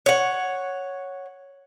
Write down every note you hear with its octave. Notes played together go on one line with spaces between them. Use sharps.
C#5 F#5